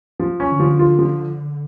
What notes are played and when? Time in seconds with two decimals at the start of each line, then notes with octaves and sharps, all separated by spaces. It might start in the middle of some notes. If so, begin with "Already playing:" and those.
0.20 F3
0.40 C#4
0.49 D3
0.60 F3
0.79 F4
0.99 F3